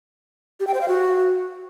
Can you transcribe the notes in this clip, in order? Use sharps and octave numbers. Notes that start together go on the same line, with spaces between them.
G4
G5
C5
F5
F#4